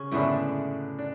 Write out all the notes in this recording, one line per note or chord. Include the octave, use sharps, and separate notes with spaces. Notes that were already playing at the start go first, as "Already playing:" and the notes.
Already playing: C#3 C#4
F#2 A2 D3 G#3 A3 B3 D4
D4